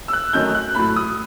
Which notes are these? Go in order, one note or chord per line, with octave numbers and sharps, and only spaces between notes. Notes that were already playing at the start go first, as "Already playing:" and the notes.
E6
F#6
F#2 D#3 F#3 A3 D#4 G6
F#6
A2 F#3 A3 E4 B5
D#6